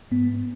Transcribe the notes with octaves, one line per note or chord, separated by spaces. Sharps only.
G#2 B3